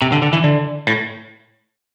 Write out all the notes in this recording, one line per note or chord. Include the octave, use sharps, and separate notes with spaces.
C3
D3
D3
E3
D3
A2